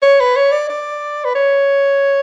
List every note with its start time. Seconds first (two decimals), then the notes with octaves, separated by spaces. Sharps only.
0.02 C#5
0.20 B4
0.36 C#5
0.52 D5
0.69 D5
1.24 B4
1.35 C#5